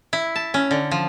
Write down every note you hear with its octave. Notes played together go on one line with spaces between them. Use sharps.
E4
A5
C#4
D3
F3